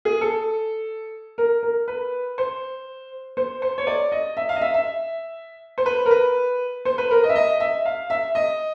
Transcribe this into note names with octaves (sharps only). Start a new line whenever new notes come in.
G#4
A4
A#4
A#4
B4
C5
C5
C5
C#5
D5
D#5
E5
F5
D#5
E5
E5
C5
B4
A#4
B4
C5
B4
A#4
D#5
E5
D#5
E5
F5
E5
D#5